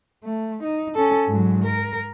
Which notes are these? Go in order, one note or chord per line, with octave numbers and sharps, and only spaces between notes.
A3
D#4
C#4 A4
G#2 F#3
A#4